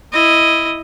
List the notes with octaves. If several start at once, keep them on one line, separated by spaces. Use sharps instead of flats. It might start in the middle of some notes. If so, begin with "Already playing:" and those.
E4 D#5